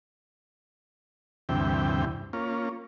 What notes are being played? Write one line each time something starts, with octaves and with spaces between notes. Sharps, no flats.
D2 G2 C3 E3 G5
A#3 C#4 F4